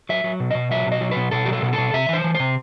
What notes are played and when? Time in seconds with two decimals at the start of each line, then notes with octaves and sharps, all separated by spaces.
0.09 F#3 E5
0.24 F#3
0.40 B2
0.51 B2 D#5
0.71 F#3 E5
0.86 B2
0.92 D#5
1.01 F#3
1.11 B2 B4
1.31 B2 A4
1.46 F#3 G4
1.53 A4
1.62 B2
1.73 A4
1.78 B2
1.93 C3 E5
2.09 E3 C5
2.24 E3
2.34 C3 C5